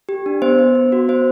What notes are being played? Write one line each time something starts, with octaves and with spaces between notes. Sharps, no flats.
G4
D4
B3 C5
B3
B3
F#4
B3 C5